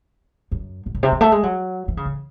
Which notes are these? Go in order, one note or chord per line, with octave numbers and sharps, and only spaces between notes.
F#2
G#2
A2
C3
E3
A3
G#3
F#3
E3
C#3
A2